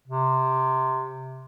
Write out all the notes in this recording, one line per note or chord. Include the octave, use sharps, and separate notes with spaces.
C3